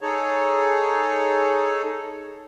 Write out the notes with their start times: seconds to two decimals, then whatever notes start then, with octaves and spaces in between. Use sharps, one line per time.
0.01 D#4 G#4 A4 C#5